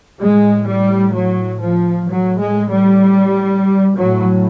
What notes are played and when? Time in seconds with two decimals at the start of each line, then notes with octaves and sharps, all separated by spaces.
0.20 A2 G#3
0.67 G3
1.15 F#3
1.61 F3
2.08 A2 F#3
2.40 G#3
2.71 G3
3.96 A2 F#3